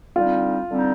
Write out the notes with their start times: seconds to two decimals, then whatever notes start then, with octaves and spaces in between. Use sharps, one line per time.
0.15 D3 G3 C4 D#4 F4
0.70 D3 G3 C4 D#4